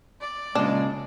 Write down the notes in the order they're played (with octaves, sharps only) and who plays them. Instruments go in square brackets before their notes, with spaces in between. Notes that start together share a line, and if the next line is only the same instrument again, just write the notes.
[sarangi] D5
[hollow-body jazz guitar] A#2 C#3 [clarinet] G#3 [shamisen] D4